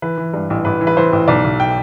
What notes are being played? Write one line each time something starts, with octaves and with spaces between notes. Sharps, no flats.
E3 B4
E3
G2
A1
A1 B4
E3
B4
E3 C5
A1
B1 D5
B1
G5